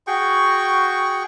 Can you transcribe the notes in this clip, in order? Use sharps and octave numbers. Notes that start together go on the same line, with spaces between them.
F#4 G#4 G5 C#6